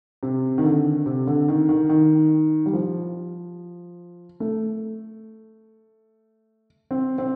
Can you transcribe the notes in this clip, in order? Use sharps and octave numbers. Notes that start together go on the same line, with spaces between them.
C3
D#3
D3
C3
D3
D#3
D#3
D#3
G3
F3
A3
C4
C4